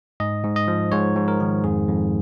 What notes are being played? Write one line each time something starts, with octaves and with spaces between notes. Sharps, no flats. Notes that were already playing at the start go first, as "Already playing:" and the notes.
G#2 D#5
G#2
D#5
F3
G#2 C#5
G#2
A#4
D#3
F2 G#4
F2